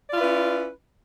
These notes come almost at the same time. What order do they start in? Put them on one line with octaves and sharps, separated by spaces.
D5 F4 E4 B4 C#4